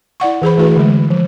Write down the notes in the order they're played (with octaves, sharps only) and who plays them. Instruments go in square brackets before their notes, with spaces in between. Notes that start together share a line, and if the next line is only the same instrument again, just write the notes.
[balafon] E4 D5 F#5 C#6
E3 G#4 C5 B5
E3 A3 E4 F#4 G#4 B4
D3 G#3
F3